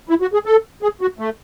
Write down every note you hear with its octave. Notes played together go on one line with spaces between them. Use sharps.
E4
F#4
G#4
A4
G#4
F#4
A3